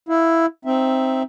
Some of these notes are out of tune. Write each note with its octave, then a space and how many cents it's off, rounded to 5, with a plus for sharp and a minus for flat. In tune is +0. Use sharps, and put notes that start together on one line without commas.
E4 +0 F5 +5
C4 +0 D#4 +0 E5 +0